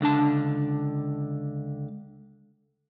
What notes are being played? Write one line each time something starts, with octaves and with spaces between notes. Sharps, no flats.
C#2 D3 D4 A5